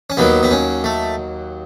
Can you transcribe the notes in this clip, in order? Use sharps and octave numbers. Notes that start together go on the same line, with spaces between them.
C#4
D#2 D#3 F#3 B3
B3
C#4
A3